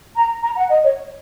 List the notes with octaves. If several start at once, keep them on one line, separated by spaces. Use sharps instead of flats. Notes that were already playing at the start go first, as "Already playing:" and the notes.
A#5
A#5
F#5
D#5
C#5